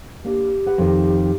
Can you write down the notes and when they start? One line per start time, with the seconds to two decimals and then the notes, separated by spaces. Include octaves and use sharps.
0.24 A#3 D4 G4
0.66 B4 F#5
0.78 F2 D#3